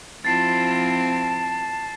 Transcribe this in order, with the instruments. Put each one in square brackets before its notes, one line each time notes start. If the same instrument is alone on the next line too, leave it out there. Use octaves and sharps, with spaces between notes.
[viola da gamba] F3 E4 F4 [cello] C4 [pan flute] A5 [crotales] A6 C7